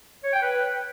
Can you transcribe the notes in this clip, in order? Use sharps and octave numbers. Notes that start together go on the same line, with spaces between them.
C#5
G5
B4